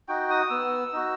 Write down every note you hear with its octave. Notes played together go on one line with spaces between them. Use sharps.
D#4 F#4 G5
D#6
B3 E6
D#4 F#4